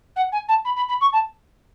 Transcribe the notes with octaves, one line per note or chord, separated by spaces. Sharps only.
F#5
G#5
A5
B5
B5
B5
C#6
A5